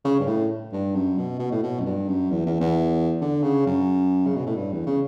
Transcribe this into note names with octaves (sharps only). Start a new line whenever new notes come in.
C#3
G2
A2
G2
F#2
B2
B2
A2
B2
F#2
G2
F#2
E2
E2
E2
D3
C#3
F#2
C#3
B2
A2
G2
E2
C#3